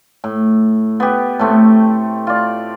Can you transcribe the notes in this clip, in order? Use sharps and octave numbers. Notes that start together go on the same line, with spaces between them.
A2
B3 G4
A2 A3 C4
F4 D5